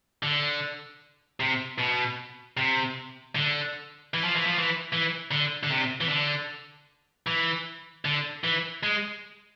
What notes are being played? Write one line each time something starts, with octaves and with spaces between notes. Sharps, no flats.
D3
C3
B2
C3
D3
E3
F3
E3
F3
E3
E3
D3
D3
C3
E3
D3
E3
D3
E3
G#3